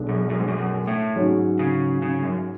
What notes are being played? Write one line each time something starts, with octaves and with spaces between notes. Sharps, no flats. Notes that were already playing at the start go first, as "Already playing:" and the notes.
Already playing: B1 B2 G#3 D4
F#2
F#2
G#2
F#2
F#2
A2
G#2 F#3 C#4
C#3
C#3
F#2